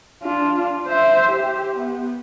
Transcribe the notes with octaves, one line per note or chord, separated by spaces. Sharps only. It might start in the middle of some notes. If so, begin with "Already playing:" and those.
D4 F4
C5 E5
G4
B3